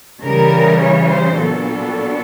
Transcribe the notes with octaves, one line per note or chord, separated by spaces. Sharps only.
C#3 E3 G3 A#4
C#5
C5
A#2 F#3 B3 D4 A4